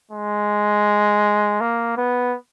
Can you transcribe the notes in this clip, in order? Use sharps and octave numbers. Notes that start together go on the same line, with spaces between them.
G#3
A#3
B3